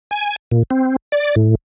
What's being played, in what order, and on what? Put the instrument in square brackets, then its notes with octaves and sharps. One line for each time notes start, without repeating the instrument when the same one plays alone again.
[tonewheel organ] G#5
A#2
C4
D5
A2